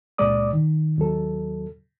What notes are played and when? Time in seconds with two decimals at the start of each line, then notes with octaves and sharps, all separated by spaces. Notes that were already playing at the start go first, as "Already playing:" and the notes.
0.18 C#2 A#2 G#3 D5 D6 D#6
0.53 D#3
0.98 D#2 F#3 A4